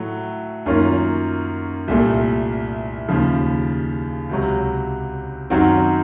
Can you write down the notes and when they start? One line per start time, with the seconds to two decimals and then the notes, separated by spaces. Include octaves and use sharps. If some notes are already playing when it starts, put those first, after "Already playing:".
Already playing: A2 F#3 A3
0.66 F#2 D#3 A#3 C#4 F4
1.88 C2 A#2 A3
3.08 D#2 C#3 F3
4.29 C#2 C3 F#3
5.50 F#2 D#3 F#3 C4 F#4